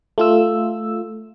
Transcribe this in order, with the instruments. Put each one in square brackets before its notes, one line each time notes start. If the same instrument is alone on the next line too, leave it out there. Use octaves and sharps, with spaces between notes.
[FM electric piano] A3 F4 E6